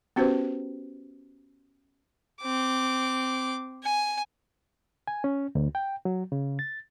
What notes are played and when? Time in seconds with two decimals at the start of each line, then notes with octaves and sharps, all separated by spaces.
0.16 B3 C#4 F#4 G4 B4 C5
2.41 C4 D6
3.84 G#5
5.07 G#5
5.24 C#4
5.55 D2
5.75 G5
6.05 F#3
6.32 C#3
6.59 A6